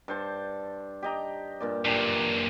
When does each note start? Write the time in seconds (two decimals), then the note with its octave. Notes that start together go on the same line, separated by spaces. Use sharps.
0.08 G2 C5 A5
1.03 G4 D#5 A#5
1.60 G2 A#2 D5
1.85 F#2 A#2 D4 G4